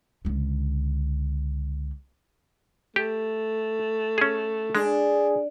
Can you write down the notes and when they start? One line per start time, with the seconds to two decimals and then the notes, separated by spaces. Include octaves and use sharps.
0.25 C#2 D3
2.96 A3 G4
4.18 C#4 G#4
4.75 G#3 D4 G#4